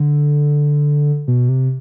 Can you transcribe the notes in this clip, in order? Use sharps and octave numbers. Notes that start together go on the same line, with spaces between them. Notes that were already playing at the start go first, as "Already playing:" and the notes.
Already playing: D3
B2
C3